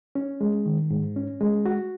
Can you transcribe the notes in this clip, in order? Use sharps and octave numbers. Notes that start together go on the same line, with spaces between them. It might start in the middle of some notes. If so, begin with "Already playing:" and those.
C#4
G#3
D#3
G#2
C#4
G#3
F#4